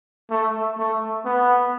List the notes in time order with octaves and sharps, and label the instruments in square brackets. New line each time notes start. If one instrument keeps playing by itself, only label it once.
[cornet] A3
A3
B3